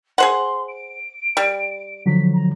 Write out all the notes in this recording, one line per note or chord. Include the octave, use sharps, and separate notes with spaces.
G#4 C5 F#5 C6
D7
G3
D3 F3 F#3 B6
A#5